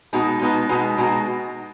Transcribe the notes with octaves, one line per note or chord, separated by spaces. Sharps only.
B2 G#3 B3 D#4 F#4
B2 G#3 B3 D#4 F#4
B2 G#3 B3 D#4 F#4
B2 G#3 B3 D#4 F#4